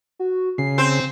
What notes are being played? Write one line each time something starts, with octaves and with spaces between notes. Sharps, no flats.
F#4
C#3 C7
C4 C5